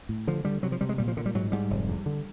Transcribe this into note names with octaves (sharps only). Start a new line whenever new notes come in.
A2
D3 F3
D3 G3
C3 F#3
F3
C3 G3
G#3
A#2 G3
F3
A#2 D3
G3
G#2 F#3
G#2 G3
F1
E2
D3